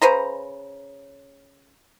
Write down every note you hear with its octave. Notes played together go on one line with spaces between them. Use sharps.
C#3 B4 C5 A#5